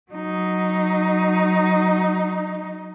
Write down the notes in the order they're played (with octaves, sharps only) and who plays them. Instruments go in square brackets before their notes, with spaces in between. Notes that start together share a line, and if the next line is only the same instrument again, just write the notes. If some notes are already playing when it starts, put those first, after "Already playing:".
[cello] F#3 D#4